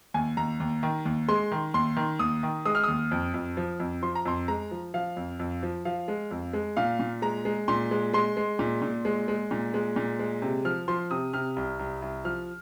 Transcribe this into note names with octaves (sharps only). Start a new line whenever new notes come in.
D#2 G#5
D#2 A#5
D#2
D#3
D#2
G#3 C6
D#3
D#2 C6
D#3
D#2 D#6
D#3
G#3 D#6
F6
D#2 D#6
F2
F2
F3
F2
F3 C6
A#5
F2 C6
G#3 A#5
F3
F3 F5
F2
F2
F3
F3 F5
G#3
F2
G#3
A#2 F5
A#2
G#3 A#5
G#3
A#2 C6
G#3
G#3 C6
G#3
A#2
A#2
G#3
G#3
A#2
G#3
A#2
G#3
C3
F3 F6
F3 C6
C3 D#6
C3 F6
C2
C2
C2
F3 F6